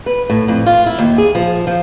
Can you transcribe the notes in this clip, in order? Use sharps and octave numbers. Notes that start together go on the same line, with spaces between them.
B4
A2
F2
F4
E4
D#2
G#4
F3
F3